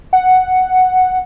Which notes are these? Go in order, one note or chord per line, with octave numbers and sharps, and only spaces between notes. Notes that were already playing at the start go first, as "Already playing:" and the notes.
F#5